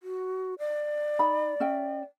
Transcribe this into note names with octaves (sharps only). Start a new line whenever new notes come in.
F#4
D5
D#4 B5
C#4 E5 G5